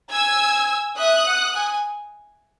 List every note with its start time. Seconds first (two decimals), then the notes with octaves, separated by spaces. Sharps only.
0.12 G#5 E6 G#6
0.97 E5 D#6 F#6
1.27 F#5
1.55 G#5